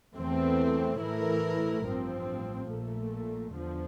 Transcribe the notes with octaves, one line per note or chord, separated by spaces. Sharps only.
E2 E3 A3 C4
A2 E3 A3 E4 A#4
A1 G2 F3 C4
A#1 A#2 A3
E2 D3 F3